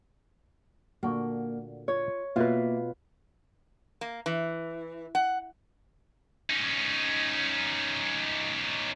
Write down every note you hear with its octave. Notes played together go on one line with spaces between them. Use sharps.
A#2 D3 A#3 F#4
F4 C#5
B2 A#3 F4 B4 E5 F5
A#3
E3
F#5
C#4 D#4